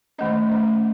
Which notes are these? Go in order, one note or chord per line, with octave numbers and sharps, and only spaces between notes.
D#3 A3 C#4 D#5
D#3 A3 C#4